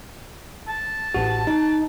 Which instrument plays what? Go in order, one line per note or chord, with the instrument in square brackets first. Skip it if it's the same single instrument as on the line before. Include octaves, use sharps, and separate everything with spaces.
[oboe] A5
[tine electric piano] A1 F#4
D#4